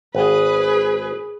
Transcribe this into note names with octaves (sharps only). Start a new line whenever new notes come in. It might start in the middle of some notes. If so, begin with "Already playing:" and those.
G#1 G#4 B4